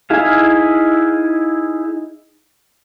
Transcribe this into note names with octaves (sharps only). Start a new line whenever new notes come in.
D#4 E4 G#4 E5 F5